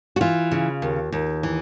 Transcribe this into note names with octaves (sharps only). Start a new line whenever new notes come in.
F#4
E3 F4
C#3
D#2
D#2
E3